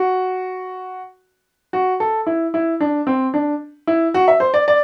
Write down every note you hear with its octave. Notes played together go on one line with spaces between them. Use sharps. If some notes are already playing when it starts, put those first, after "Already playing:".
Already playing: F#4
F#4
A4
E4
E4
D4
C4
D4
E4
F#4
E5
C5
D5
D5